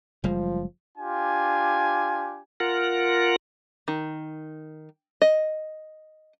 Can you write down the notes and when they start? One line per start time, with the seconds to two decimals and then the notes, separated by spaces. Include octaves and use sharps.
0.24 F#1 F3 G3 G#3
0.98 D4 F4 G4 G#5
2.60 F4 A#4 F#5
3.88 D#3
5.22 D#5